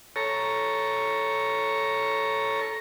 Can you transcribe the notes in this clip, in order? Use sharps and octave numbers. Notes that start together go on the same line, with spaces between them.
A4 C#5 A#5